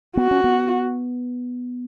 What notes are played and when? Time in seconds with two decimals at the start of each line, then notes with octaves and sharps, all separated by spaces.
0.17 B3 F#4
0.31 C#4
0.44 B3